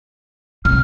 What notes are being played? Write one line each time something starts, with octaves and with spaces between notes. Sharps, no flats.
C3 F6